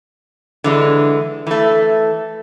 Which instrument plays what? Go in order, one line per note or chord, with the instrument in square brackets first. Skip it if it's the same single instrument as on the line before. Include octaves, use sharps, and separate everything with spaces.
[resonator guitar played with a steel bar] D3 E3 G#3
E3 A3